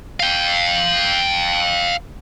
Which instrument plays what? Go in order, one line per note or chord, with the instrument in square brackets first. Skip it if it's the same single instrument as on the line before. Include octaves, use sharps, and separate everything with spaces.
[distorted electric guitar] F5 G5